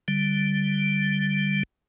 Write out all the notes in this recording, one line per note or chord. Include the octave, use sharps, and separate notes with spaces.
D3 G3